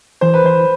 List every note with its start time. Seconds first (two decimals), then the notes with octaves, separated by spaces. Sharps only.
0.21 E3 C5
0.34 B4
0.44 E3 C5